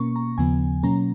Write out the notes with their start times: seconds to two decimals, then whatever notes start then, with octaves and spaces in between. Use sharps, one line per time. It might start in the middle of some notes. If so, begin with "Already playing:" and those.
Already playing: B2 A#3 C#4 C#6
0.16 A#5
0.38 D#2 C#3 F3 B3 G#5
0.83 B2 F#3 A#3 C#4 A#5